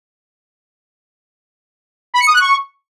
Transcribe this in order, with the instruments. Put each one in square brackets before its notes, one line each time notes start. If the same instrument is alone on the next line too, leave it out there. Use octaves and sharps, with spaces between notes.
[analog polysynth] B5
C#7
D#6
F#6
C#6